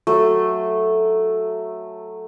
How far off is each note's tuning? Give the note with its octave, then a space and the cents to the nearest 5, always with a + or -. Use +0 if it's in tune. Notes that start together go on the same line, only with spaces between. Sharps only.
F#3 -5 A3 +0